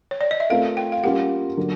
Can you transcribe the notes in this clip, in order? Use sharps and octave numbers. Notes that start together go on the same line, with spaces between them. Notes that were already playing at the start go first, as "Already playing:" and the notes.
C#5
D5
D#5
E5
A3 C4 F4 A#4 F5
G5
F5
G3 A#3 C#4 F4 F#5
D3 F#3 A#3